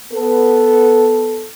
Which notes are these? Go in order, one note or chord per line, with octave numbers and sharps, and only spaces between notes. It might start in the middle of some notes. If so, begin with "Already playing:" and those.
B3 A4